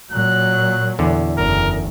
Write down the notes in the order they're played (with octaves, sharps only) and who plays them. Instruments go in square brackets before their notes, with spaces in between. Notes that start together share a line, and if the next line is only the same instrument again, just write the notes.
[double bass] A#2 F#3 [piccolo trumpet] F#6
[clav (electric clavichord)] E2 D3
[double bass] F#1 [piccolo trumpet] A#4